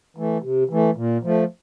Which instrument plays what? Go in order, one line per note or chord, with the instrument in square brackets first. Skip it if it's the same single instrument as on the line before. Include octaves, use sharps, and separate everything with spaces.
[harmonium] E3 A3
C3
E3 A3
A#2
F3 A3